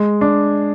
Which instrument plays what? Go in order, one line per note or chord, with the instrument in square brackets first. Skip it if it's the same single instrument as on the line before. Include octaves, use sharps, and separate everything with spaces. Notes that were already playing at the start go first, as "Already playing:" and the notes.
Already playing: [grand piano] G#3
D4